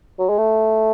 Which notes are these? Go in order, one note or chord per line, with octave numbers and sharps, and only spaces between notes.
F#3
G#3
A3